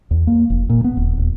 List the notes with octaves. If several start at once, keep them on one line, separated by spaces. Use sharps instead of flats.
E2
A#3
F1
A#2
B3
D#1
D#1